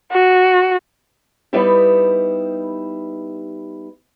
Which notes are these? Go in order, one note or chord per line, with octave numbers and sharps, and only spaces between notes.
F#4
G3 B3 D#4 E4 G4